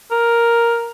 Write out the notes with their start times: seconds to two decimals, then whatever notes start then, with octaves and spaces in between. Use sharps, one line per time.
0.11 A#4